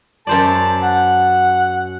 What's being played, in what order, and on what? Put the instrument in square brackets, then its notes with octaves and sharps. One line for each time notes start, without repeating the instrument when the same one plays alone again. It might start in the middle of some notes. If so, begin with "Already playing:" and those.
[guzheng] F#2 C5 D5 [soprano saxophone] A5
[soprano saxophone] F#5